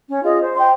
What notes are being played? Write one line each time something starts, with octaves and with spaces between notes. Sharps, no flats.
C#4
F4 G#4 D#5
C5
G5 C6